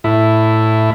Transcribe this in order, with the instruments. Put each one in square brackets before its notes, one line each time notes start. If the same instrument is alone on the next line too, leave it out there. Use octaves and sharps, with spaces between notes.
[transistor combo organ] A2 E4